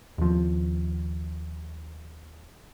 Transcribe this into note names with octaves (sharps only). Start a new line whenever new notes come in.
D#2 F3